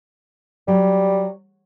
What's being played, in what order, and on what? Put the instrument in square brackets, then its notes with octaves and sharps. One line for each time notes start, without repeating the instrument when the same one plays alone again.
[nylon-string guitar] F#3 [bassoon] G3